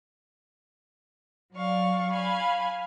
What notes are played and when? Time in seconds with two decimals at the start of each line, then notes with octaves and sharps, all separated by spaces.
1.54 F#3 D5 F5 C#6
2.11 F5 G#5 B5